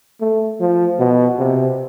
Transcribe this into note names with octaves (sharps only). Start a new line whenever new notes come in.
A3
F3
B2
C3